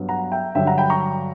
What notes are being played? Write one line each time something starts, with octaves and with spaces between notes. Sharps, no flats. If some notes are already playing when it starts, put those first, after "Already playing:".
Already playing: G2 F#3 B3
F#5 A#5
E5 G5
G2 D3 F#3 E5 G5
F#5 A#5
G5 B5
A#5 C#6